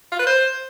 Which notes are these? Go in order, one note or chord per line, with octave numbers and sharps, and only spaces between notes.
F4
B4
C5